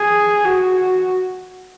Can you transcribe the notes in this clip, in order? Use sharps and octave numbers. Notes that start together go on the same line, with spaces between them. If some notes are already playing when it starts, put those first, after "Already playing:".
Already playing: G#4
F#4